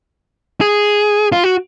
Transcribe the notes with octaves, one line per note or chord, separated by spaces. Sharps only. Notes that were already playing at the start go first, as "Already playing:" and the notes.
G#4
F4
F#4